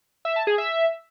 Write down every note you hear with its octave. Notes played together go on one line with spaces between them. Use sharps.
E5
A5
G#4
E5